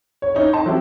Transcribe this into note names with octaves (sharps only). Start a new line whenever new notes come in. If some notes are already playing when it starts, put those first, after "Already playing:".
C#5
C#4 D#4 E4 C#5
D#4 D#5 A5 C6
F3 F#3 C4 E4 G4